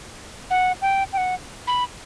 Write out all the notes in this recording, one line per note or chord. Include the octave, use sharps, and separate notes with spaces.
F#5
G5
G5
F#5
B5